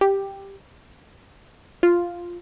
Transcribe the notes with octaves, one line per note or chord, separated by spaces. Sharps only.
G4
F4